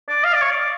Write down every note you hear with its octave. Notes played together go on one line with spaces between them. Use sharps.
D5
F5
D5
C#5
D5